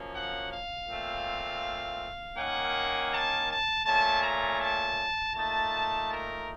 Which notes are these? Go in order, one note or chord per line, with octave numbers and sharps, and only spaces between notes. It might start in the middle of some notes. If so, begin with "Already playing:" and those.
Already playing: F#2 F3 A#3 C#4
F#5
F5
A#2 A3 C4
D#3 A#3 C#4 F#5
A5
A5
A#2 A3 C#4 A5
A#5
A5
A#2 A3 D#4 A5
A#4